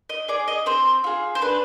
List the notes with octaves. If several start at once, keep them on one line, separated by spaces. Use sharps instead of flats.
D#5
G#4 D5
D#5
C4 C5
F4 G#4
C5
D4 B4